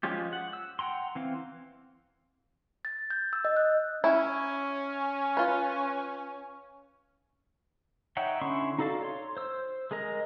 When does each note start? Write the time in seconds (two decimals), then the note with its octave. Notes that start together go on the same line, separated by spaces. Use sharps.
0.03 F3 G#3 C#4 F4 G4
0.33 F#5
0.53 E6
0.79 F#5 G5 A#5 C6
1.15 E3 C4 F5
2.85 A6
3.10 G6
3.33 E6
3.45 D#5
3.57 F#6
4.04 C#4 E4
5.37 F4 B4
8.17 D#4 C#5 E5 F#5 G5
8.41 D3 C#4 E4 C6 C#6
8.79 D#4 F#4 A4 D5 F5
9.03 C#5 C6
9.37 C5 E6
9.91 G#3 G#4 A#4 D#5